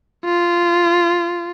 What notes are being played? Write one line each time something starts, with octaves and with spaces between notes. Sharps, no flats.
F4